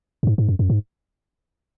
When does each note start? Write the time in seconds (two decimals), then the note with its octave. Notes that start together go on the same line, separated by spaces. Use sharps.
0.23 F#2
0.27 G#2
0.38 G#2
0.48 F#2
0.59 F#2
0.70 G#2